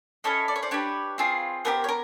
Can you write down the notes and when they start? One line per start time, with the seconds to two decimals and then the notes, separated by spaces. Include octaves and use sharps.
0.24 C#4 E4 A4 C#5 D#5
0.48 D5
0.56 C#5
0.63 C5 D5
0.71 D4 G4 B4 C#5
1.18 C4 F4 G#4
1.65 B3 D4 G4 A#4 C5
1.84 C#5
1.89 A#4